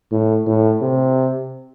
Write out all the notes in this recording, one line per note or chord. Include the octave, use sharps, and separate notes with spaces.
A2
A2
C3